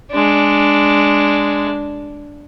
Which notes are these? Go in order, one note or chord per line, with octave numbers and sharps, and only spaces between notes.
G#3 D4